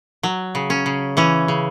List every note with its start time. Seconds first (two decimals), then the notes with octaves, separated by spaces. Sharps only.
0.23 F#3
0.55 C#3
0.70 C#4
0.86 C#3
1.17 E3 C#4
1.48 C#3